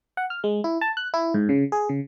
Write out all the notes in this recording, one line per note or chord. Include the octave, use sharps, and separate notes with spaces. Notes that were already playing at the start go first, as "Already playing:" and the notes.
F#5
F6
G#3
E4
A5
F#6
E4
G#2
C#3
G#4
C#3